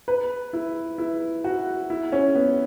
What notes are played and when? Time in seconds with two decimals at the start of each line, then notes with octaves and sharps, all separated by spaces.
0.08 B4
0.53 E4
0.98 E4
1.44 F#4
1.90 E4
2.12 C#4
2.35 B3